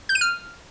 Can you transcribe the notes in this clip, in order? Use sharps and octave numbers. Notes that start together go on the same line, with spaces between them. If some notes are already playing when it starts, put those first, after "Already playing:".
G6
D#7
F6